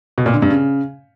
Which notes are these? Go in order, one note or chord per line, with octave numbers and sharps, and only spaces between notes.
B2
A#2
D3
G2
C#3